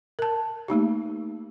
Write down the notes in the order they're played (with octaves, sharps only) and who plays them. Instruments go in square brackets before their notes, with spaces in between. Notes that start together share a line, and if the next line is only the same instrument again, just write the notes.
[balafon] A#4 A5
A3 A#3 D#4 G4